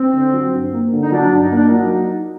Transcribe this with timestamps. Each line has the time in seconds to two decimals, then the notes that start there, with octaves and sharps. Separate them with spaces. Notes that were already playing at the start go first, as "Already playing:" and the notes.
Already playing: C4
0.13 D3
0.33 F#3
0.53 G2
0.73 A#3
0.92 D3
1.02 D#4
1.12 F#3 D4
1.32 G2
1.42 D#4
1.51 A#3 D4
1.68 F#3 D#4